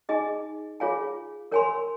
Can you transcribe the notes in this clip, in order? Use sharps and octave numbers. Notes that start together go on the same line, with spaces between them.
D#4 G#4 D#5 G#5
F4 G#4 C#5 F5 G#5
A#4 C#5 G#5 C6